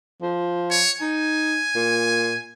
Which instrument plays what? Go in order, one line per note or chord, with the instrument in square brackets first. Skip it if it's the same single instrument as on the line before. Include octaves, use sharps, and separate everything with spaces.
[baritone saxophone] F3
[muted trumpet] C#5
[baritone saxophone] D#4 [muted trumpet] G#5
[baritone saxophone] A#2